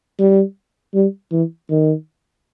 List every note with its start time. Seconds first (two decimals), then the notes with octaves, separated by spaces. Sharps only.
0.19 G3
0.94 G3
1.32 E3
1.70 D#3